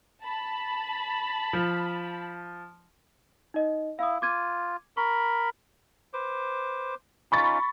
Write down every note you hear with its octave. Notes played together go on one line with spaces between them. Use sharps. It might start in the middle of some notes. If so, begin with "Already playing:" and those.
A5 B5
F3
D#4 D#5
E4 F5 D#6
F4 D6 G#6 D#7
A#4 B5 C#6
B4 C5 D6
C#4 D#4 F4 B5 C#6 A6